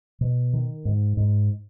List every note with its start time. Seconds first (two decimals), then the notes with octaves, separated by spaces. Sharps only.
0.21 B2
0.53 D#3
0.85 G#2
1.17 G#2